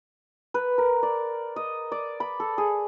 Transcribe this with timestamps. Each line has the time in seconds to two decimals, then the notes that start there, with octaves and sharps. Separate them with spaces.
0.54 B4
0.78 A#4
1.03 D5
1.56 D#5
1.92 D5
2.20 B5
2.40 A4
2.58 G#4